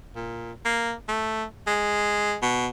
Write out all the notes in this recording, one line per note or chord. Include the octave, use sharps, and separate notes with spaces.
A#2
A#3
A3
G#3
B2